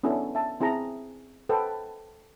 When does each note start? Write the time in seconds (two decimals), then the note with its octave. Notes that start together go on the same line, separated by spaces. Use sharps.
0.04 B3 C#4 D4 E4 A4
0.35 E5 A5
0.60 C4 E4 G#4 A5 A#5
1.49 A4 B4 C5 F#5 G5